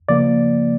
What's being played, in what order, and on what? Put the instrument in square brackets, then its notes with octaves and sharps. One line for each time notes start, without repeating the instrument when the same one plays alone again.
[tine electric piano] C#3 F3 A#3 D5